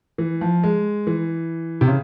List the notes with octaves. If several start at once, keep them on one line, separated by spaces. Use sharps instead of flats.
E3
F3
G#3
E3
C3
C#3